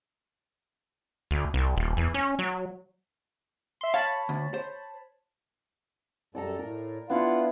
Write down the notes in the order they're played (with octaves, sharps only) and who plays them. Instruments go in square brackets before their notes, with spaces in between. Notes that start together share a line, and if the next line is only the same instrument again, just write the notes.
[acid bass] D2
C2
D#1
E2
C#4
F#3
[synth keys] E5 C6
[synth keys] C#5 A5 B5 [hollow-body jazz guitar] F5
[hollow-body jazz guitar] D2
C5
[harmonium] F#2 G3 A4 [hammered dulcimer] D5 A5 A#5
[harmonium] A2 [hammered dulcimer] A#4
[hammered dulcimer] B3 D4 E4 [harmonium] F4 F5 F#5